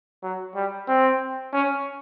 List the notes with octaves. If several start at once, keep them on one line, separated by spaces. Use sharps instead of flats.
F#3
G3
C4
C#4